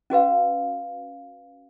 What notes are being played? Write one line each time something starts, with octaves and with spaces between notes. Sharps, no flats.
C#4 F#4 B4 F5